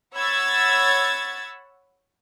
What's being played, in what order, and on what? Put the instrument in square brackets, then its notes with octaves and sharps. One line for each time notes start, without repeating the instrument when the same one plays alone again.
[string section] C#5 F#5 B5 E6 G#6 A6